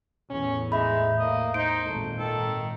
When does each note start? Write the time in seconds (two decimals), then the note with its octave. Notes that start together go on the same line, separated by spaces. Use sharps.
0.30 E2 A2 C#4
0.72 G#3 D#4 E5 B5
1.18 A#3 D#5
1.54 D#4 C5 D7
1.86 G#1 A#2 A3
2.19 D#3 A4